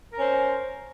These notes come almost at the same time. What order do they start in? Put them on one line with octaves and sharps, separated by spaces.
A#4 C#4 C5